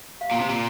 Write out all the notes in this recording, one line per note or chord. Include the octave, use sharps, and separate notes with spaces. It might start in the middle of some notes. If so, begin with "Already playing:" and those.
F5
A#2 G5
C3
A#2